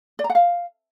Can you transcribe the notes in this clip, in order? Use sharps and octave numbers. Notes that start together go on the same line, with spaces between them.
D5
A#5
F#5
F5